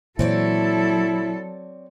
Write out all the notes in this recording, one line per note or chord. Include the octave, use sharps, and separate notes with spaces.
A#2 E3 F#3 C4 E4 A4 C#5 D5